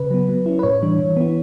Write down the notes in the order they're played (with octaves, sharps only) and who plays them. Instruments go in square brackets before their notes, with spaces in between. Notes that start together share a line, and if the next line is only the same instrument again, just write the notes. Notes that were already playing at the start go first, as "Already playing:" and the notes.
Already playing: [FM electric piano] C#3 B4
F#3 B3
F#3
C#4 E4
B4
A2 C#5
E3 G3 D4
E3
B3 E4